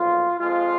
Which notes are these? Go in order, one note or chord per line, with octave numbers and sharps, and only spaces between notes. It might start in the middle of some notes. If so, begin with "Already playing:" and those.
Already playing: B1 A#2 F3 F4
F2 F3 G#3 F4